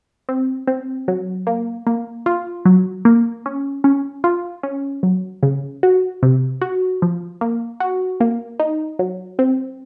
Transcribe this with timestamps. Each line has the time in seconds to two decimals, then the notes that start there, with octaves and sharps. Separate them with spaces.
0.29 C4
0.68 C4
1.08 F#3
1.47 A#3
1.87 A#3
2.26 F4
2.65 F#3
3.05 A#3
3.46 C#4
3.84 C#4
4.24 F4
4.63 C#4
5.03 F#3
5.43 C#3
5.83 F#4
6.23 C3
6.61 F#4
7.02 F3
7.41 A#3
7.80 F#4
8.20 A#3
8.59 D#4
8.99 F#3
9.39 C4